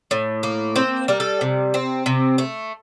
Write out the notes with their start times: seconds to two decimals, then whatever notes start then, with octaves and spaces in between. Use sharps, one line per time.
0.11 A2
0.43 A#3
0.76 C4 C5
1.08 G3 A#4
1.20 A4
1.41 C3
1.74 C4
2.06 C3
2.38 A3